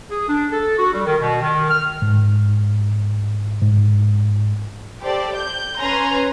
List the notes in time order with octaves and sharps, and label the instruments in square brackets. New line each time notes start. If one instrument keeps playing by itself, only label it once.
[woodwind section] G#4
D4
A4
F#4
G3
D#3
B2
D#3
F6
[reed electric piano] G#2
G#2
[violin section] G4 A4 C5 D5
G6
C#4 B4 G#5 A#5 C6